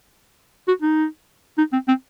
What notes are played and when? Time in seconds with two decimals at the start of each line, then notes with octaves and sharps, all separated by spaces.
0.68 F#4
0.82 D#4
1.58 D#4
1.73 C4
1.88 C4